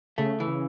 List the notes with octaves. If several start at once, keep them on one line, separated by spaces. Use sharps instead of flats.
C#3 A3
E3
C#3